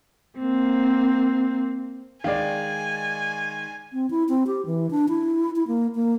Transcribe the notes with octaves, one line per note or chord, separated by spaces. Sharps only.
A#3 C4
D#3 G#3 D5 F5 G#5
C4
E4
C4
G4
E3
D4
E4
E4
A#3
A#3